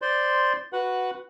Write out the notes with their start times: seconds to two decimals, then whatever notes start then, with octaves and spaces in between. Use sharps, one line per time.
0.02 C5 D5 C6
0.73 F#4 B4 F#5